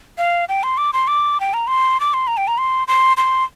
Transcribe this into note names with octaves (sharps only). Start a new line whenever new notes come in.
F5
G5
C6
D6
C6
D6
G5
A#5
C6
D6
C6
A#5
G5
A#5
C6
C6
C6